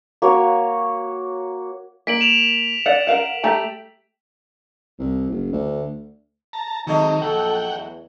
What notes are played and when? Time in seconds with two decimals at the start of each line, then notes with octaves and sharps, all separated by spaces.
0.22 A#3 F#4 C#5
2.07 A#3 B6 D7 F#7
2.21 E7 F7
2.86 D5 F#5
3.07 A#4 F5 F#5
3.44 A3 G4 A#5
4.99 C2
5.30 F#1
5.53 D2
6.53 A5 A#5
6.87 D#3 F#3 G#3 A3 C4 D#4 D#5
7.22 A#1 A4 F#5 G5
7.70 E2